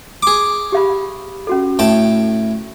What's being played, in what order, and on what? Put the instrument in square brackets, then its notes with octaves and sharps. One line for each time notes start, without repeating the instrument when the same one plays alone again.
[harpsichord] G#4 D6
[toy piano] G4 F5 B5
C#4 F#4 A4
[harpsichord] A2 G5 A5